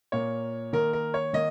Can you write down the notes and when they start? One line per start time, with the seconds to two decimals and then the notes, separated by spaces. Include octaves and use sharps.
0.12 A#2 A#3 C#5
0.73 D#3 A#3 A#4
0.93 A#4
1.14 C#5
1.33 D#3 A#3 D#5